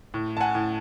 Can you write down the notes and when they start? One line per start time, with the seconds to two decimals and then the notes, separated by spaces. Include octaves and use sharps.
0.14 A2
0.37 A5
0.40 F#5 G#5
0.55 A2